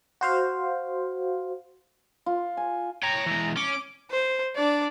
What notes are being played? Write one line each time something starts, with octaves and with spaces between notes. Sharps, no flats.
F#4 C5 F5
F4
G#5
C#5 G5 A#5
E3 G#3
C#4 D6
C5
D4 D5